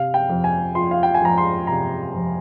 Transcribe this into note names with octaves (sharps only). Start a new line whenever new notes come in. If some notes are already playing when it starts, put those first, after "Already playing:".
Already playing: C3 F5
G5
F2
G#5
F3 C6
F5
G5
G#5
F2 A#5
C6
C3 A#5
F2